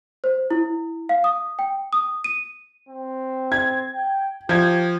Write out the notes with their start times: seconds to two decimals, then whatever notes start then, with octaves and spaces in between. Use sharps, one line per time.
0.24 C5
0.51 E4
1.09 F5
1.24 D#6
1.59 G5
1.93 D#6
2.24 D#7
2.89 C4
3.52 G#6
3.94 G5
4.49 F3 G4 G6 G#6